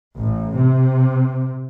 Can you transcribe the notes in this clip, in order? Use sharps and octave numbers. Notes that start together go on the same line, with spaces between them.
A1
C3